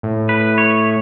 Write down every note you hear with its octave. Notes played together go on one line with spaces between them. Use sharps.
A2
B4
C#5